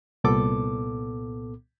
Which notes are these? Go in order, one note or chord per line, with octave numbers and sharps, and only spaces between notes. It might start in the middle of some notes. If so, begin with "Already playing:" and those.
C2 A#2 B3 A4 D6